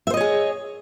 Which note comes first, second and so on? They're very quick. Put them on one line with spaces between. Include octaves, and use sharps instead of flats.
E5 C5 D#5 C#5 G#4